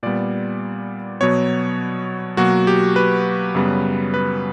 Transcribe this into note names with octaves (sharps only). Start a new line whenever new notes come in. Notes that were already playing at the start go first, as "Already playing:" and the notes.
A#2 G3 B3 D5
B2 F#3 B3 C#5
B2 F#3 A#3 F#4
G4
B4
F#2 C#3 G3 B3
B4